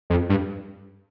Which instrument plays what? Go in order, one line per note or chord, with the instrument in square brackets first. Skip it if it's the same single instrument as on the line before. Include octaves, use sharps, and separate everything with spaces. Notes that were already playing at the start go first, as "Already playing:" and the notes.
[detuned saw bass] F2
G2